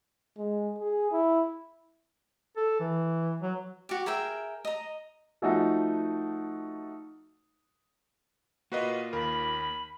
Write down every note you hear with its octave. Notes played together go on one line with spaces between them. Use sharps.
G#3
G#4
E4
A4
E3
F#3
F#4 G4
G#4 A#4 E5 G5
D#5 A#5
F3 A3 D#4 F#4
A#3 F4 F#4 B4 D#5
D#2 A#4 B5